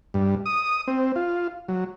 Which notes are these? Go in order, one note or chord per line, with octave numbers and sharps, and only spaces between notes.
G2
D#6
C4
F4
F#3